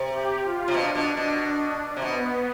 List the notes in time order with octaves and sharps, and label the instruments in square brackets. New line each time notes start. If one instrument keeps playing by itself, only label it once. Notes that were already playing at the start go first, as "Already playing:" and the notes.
Already playing: [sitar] C3
[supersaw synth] G4
F4
[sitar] C3
[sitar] B2 [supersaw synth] D4
[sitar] B2
B2
C3
[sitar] B2 [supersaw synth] B3